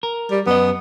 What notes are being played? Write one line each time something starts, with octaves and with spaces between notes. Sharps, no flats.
A#4
G3
F#2 B3 D#5